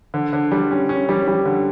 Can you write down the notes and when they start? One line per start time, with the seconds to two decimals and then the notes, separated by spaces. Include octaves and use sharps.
0.14 D3
0.33 D3
0.51 G3
0.71 C#4
0.89 C#4
1.09 G3
1.28 G3
1.45 D3